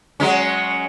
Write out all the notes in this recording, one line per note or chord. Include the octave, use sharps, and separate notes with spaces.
F#3 G#3 C#4